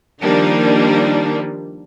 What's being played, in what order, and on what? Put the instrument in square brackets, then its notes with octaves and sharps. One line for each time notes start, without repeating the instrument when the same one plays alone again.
[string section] D#3 F3 G3 A#3 D4 D#4